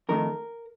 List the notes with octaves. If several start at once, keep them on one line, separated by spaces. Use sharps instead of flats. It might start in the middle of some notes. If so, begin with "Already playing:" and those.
F2 D#3 A3 A#4